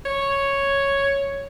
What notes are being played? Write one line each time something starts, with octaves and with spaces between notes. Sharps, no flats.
C#5